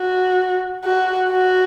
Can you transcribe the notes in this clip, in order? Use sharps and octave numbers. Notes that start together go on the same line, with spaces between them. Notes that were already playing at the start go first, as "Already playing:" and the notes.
Already playing: F#4
F#4
F#4